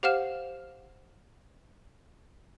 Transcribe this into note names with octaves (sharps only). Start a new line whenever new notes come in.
G4 C5 F5 F#5 F6 E7